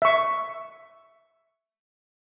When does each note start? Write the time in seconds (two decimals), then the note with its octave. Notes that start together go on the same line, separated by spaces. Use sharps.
0.02 E5 C#6